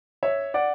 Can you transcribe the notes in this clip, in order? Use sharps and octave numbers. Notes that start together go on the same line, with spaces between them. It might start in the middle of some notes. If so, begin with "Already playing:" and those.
C#5 E5
D5 F#5